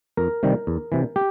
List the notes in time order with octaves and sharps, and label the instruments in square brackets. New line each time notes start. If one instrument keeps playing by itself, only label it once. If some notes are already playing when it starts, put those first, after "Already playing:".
[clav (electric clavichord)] F2 A#4
C3 D#3 G3
E2
C3 E3
G4